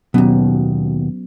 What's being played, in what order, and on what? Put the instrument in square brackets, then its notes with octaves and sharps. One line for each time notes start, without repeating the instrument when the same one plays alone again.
[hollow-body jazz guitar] D#2 B2 [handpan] F#3 B3 C#4